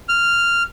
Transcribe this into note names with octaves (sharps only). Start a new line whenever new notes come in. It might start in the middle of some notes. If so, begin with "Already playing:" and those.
F6